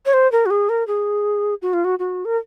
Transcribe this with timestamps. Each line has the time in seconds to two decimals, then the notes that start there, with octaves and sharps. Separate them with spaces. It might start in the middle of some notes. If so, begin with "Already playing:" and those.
0.06 C#5
0.13 C5
0.32 A#4
0.46 F#4
0.50 G#4
0.69 A#4
0.87 G#4
1.62 F#4
1.73 F4
1.84 F#4
1.99 F#4
2.25 A#4